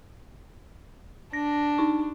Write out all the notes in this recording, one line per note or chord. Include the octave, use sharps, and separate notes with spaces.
D4 A#6
D#4 C#6